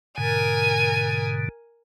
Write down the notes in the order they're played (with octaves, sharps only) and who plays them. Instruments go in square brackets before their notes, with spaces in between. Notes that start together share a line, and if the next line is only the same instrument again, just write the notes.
[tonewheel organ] G#2 B2 D3 [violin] A#4 G#5